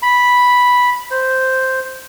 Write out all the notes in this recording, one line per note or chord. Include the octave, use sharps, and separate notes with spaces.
B5
C5